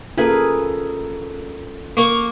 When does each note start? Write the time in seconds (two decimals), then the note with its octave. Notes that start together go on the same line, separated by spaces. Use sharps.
0.18 A#3 C#4 F4 G#4 A4 B4
1.97 A#3 C#6